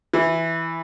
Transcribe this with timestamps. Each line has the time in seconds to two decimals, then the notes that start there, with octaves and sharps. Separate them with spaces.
0.14 E3